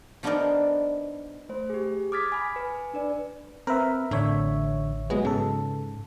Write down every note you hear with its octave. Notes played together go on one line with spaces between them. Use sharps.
F3 B3 D4 D#4 A#4 D5
A3 C5
G4 G#4
D6 D#6 F6 G#6 A6 B6
G#5 B5
B4 G#5
D4 B4 D5
C4 A#4 B4 E5
A1 D3 C#5 E5
B2 F#3 G#3 B3
G#2 C#3 A4